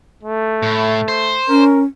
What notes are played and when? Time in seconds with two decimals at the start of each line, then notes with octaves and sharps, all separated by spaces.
0.23 A3
0.63 A2
1.08 C5
1.48 C#4 A#4